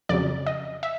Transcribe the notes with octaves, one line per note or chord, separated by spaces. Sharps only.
F2 C#3 F#3 D5
D#5
E5